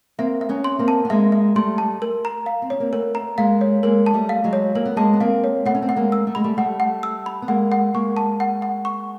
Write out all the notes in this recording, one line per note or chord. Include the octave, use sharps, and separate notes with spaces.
A#3 C4 E5
E5
B3 C#4
C6
A#3 C4
A5
B3
G#3 A#3 E5
E5
G3 A3 C6
A5
A#4
A#5
F5
C4
C#4 C#5
A#3 C4
A3 B3 A#4
A#5
G#3 A#3 F5
C#5
G#3 A#3 A#4
A5
G3 A3
F5
F#3 G#3
C#5
A#3 A#4
B3
G#3 A#3 A5
B3
A#3 C4 F5
C#5
A3 B3 F#5
C#4
C4
B3 F#5
G#3 A#3
E6
A3
G#3 B5
G3 A3
G3 A3 F#5
F#5
E6
B5
B3
G#3 A#3 F#5
F#5
G#3 A#3 C#6
A5
F#5
F#5
C#6